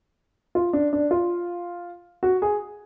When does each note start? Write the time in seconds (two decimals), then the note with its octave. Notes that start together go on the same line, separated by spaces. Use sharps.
0.55 F4
0.73 D4
0.93 D4
1.11 F4
2.23 F#4
2.42 G#4